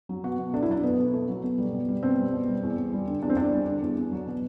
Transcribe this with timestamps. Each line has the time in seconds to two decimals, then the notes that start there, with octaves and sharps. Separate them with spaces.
0.09 F#3
0.24 B2 F#4
0.39 B2
0.54 A3 D4
0.63 E4
0.69 F#3 D4
0.84 B2 B3
0.98 B2
1.13 A3
1.28 F#3
1.44 B2
1.58 G3
1.73 B2
1.88 G3
2.03 B2 C4
2.18 G3
2.33 B2
2.48 G3
2.63 E2
2.78 E2
2.93 G3
3.07 D3
3.22 E2 D4
3.30 C4
3.37 E2 D4
3.52 G3
3.67 D3
3.82 E2
3.97 E2
4.12 F#3
4.27 B2